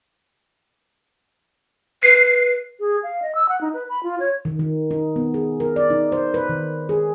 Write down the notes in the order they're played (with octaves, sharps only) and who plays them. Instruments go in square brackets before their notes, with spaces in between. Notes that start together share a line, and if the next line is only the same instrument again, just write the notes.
[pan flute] B4 [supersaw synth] C7
[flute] G#4
F5
D#5
E6
F#5
D#4
B4
B5
F4
C#5
[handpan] D#3
D#3
D#4
B3
G#4
A#4
D5
D#4
C5
B4
D#3
G#4